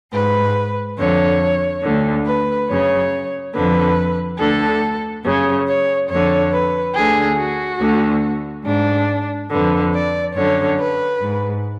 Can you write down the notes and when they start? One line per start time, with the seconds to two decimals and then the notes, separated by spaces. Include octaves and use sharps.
0.12 G#2 B4
0.97 F2 D3 C#5
1.82 D2 D3
2.26 B4
2.68 F#2 C#3 C#5
3.53 F2 D3 B4
4.38 D2 D3 A4
5.24 F#2 C#3 C#5
5.67 C#5
6.09 F2 D3 C#5
6.52 B4
6.94 D2 D3 G#4
7.37 F#4
7.80 D2 D3
8.64 G#2 D4
9.50 F2 D3 B4
9.93 D5
10.35 F#2 D3 C#5
10.78 B4
11.20 G#2